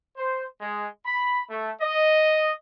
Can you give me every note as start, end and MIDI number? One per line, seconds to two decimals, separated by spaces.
0.17 0.44 72
0.61 0.88 56
1.06 1.42 83
1.50 1.70 57
1.81 2.51 75